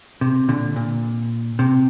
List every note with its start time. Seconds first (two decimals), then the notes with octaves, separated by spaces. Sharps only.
0.21 C3
0.49 A#2 D3
0.76 A#2
1.59 C3